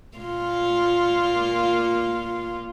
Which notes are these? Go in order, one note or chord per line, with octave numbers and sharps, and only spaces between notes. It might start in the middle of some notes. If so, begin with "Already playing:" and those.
A#2 A#3 F4